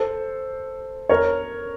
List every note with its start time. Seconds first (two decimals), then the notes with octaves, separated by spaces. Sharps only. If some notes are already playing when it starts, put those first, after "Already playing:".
Already playing: A4 C5
1.09 A#4 C#5